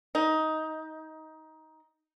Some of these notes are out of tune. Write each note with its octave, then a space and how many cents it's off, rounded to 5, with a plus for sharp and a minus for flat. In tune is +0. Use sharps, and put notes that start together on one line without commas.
D#4 +15